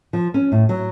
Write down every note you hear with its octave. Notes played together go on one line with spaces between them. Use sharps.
F3
C#4
A2
F#3